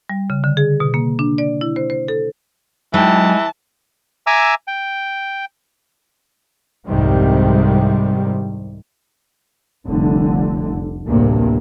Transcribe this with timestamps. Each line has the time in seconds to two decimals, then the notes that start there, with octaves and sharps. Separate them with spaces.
0.10 G3
0.30 C#3
0.44 D3
0.57 G#4
0.80 B2
0.94 A#3
1.19 D4
1.38 D5
1.61 E4
1.76 C5
1.90 C5
2.08 A4
2.94 E3 F#3 G#3 D#4 D#5 G5 A5
4.27 E5 G#5 A#5 D6 E6
4.67 G5
6.87 C2 F2 G#2 C3 D#3 G3
9.86 F1 C2 D3
11.06 A1 D2 G2 C3 A#3